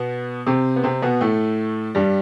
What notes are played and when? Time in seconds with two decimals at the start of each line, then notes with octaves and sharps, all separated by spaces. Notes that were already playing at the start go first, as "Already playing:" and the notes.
Already playing: B2 B3
0.47 C3 C4
0.76 B3
0.83 C3 C4
1.02 B2 B3
1.21 A2 A3
1.95 G2 G3